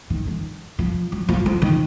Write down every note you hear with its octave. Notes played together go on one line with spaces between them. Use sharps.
D#3
D#3
F3
F#3
F3
F3
D#3